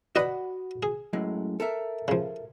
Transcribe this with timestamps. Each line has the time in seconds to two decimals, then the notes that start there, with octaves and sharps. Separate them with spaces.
0.16 F#4 B4 D5 D#5 F#5 B5
0.83 G#4
1.13 F#2 A2 G#3
1.60 A4 A#4 E5
2.08 C#3 F3